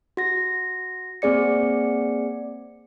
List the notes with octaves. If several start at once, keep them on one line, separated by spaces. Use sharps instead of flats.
F#4 A#6
A#3 C4 G#4 D5 C#7